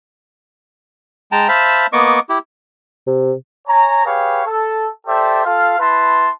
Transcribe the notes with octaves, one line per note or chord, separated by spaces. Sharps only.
G#3 G5 A5 A#5
C5 E5 F5 A5 B5
A#3 B3 D#5 C#6 D6
E4 G4
C3
C#5 G#5 A#5
G4 G#4 B4 C#5 F5
A4
G4 A4 C5 D5 E5
F4 A4 F5
E4 B4 A5 C6